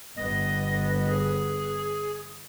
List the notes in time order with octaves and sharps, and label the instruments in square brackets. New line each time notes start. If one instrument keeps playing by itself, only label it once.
[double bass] G1 B3 [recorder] D#5
[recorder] G#4